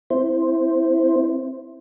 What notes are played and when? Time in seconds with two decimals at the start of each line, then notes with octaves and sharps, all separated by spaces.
0.10 C4 E4 C5